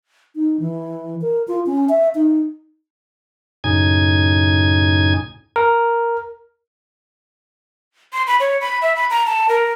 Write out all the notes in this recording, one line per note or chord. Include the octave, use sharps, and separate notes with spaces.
D#4
E3
A#4
F4
C#4
E5
D#4
F#2 A2 C#3 D#4 G#5 G#6
A#4
C6
B5
C#5
B5
E5
B5
A#5
A5
A#4